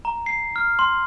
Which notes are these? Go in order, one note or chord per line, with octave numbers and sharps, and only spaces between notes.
A#5
C7
F6
C6